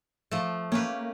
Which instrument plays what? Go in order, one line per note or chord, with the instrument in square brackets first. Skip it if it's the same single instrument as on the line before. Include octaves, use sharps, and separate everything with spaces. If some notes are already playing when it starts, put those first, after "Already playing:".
[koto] F3 A3
[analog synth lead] A#3 [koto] C#4 G4 B4